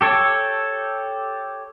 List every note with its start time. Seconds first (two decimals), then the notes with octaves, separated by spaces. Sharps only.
0.01 G4 A4 C#5